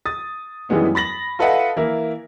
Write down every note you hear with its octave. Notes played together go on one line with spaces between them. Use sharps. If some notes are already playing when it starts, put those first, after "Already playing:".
D#6 A6
F#2 E3 G3 G#3 B3 D#4
B5 A6 A#6 F#7
F4 A4 B4 D#5 E5 F#5
E3 A#3 E4 A#4